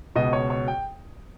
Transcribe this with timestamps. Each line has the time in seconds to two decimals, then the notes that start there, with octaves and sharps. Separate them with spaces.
0.15 C#2 B2 D#5
0.33 C#5
0.50 C#5
0.68 G5